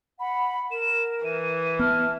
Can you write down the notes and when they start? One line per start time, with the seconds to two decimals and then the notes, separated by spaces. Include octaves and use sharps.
0.20 F#5 B5
0.71 A#4 E7
1.25 E3 D#7
1.79 B3 A5 F6